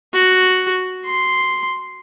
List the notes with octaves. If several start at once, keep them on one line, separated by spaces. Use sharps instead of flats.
F#4
C6